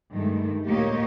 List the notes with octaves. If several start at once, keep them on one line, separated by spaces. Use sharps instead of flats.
G2 D#3 G#3 A3
D2 A#2 A#3 G4 C#5 D#5